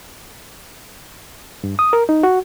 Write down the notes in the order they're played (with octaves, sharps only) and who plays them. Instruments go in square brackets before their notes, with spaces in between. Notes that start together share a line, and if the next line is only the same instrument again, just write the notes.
[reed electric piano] G2
D#6
A#4
D#4
F#4